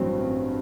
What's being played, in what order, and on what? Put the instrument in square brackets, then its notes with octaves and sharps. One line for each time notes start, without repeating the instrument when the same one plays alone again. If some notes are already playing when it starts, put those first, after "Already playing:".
Already playing: [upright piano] A1 G2 F#3 C4